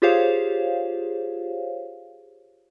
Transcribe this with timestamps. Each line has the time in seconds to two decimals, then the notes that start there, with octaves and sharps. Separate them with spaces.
0.02 F4 G4 G#4 C5 C#5 F5